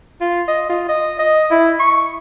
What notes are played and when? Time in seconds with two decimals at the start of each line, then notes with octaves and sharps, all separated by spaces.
0.21 F4
0.48 D#5
0.69 F4
0.89 D#5
1.19 D#5
1.51 E4
1.79 C#6